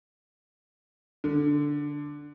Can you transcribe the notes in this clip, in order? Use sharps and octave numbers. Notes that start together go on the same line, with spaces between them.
D3